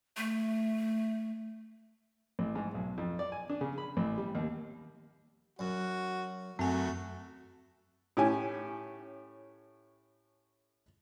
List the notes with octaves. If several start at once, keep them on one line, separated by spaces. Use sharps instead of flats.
A3
A1
G#2
B1
F2
D5
G#5
D4
C#3
B5
A1
G3
D#2
F#2 F#4
F#2 A3 C4 F#4 G#5
A2 C#4 G4 G#5